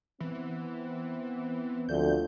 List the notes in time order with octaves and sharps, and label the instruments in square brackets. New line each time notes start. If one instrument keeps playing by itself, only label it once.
[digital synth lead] E3 [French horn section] B3 C4
[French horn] D2 [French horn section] F3 A3 D4 [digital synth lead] G6